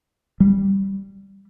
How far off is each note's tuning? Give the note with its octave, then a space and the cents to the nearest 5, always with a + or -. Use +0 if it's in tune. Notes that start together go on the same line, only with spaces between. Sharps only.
G3 +0